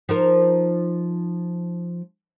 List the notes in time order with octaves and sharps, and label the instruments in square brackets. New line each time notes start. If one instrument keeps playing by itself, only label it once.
[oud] F3 D#4 A#4